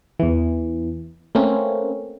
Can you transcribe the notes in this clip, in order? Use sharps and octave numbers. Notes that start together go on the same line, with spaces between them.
E2 E3
A3 A#3 C4 C#4